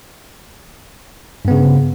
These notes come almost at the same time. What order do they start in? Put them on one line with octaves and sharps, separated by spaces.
G2 B3 C#3